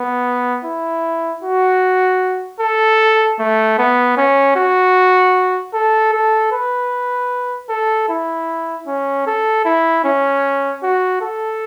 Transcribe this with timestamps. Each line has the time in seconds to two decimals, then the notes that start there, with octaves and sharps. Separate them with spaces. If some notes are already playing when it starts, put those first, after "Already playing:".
Already playing: B3
0.64 E4
1.43 F#4
2.60 A4
3.39 A3
3.78 B3
4.17 C#4
4.56 F#4
5.74 A4
6.13 A4
6.52 B4
7.69 A4
8.09 E4
8.87 C#4
9.27 A4
9.65 E4
10.04 C#4
10.83 F#4
11.22 A4